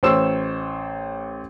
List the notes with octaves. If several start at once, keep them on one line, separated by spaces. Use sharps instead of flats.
A1 C5 C#5 C6 E6 E7